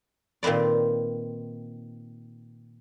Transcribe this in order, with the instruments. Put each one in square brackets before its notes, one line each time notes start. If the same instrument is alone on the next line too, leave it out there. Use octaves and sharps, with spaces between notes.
[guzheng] A#2 D#3 C4 B4 D5